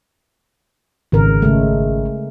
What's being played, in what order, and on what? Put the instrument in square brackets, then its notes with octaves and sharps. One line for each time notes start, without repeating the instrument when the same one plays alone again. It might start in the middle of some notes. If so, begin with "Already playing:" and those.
[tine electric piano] G#1 [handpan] C#3 A#4
[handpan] C#3 G#3 A3